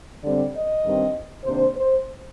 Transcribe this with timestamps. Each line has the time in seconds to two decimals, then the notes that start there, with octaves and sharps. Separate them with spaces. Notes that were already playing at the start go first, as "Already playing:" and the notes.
0.23 D3 G3 C4 D5
0.53 D#5
0.84 G2 D#3 G3 C4
1.44 C3 D#3 A#3 D4 C5
1.75 C5